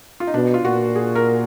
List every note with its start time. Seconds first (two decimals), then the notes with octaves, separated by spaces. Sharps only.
0.20 F4
0.27 D#4
0.34 B2 D4
0.54 F4
0.65 A#2 F#4
0.95 G#4
1.15 A#4